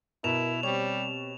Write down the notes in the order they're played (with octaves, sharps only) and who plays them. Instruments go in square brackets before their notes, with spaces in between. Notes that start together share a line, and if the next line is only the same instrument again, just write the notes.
[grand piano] B2 [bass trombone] E4 [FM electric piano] A#4 [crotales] E7 F7
[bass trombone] G3 [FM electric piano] C4 G4 C#5 [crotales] F7